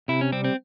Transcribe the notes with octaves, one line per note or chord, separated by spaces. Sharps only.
C3 E4
C#4
G3 C4
C4